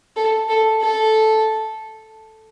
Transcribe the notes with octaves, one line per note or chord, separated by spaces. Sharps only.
A4
A4
A4